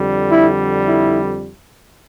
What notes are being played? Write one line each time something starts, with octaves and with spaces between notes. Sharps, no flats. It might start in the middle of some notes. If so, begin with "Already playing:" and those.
Already playing: F2 D3 G3
E4
E4